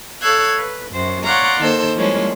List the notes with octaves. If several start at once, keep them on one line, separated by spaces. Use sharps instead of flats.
A4 C#5 F5 E6 F#6 G#6
B4
F#2 C5
C#5 D5 F5 F#5 A#5 C6
D#3 A#3 A4 C5
F3 G3 G#3 A#3 C#4 E4